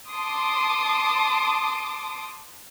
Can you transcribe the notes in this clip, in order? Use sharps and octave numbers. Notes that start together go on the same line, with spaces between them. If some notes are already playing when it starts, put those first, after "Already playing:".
A5 C6 D6 D#6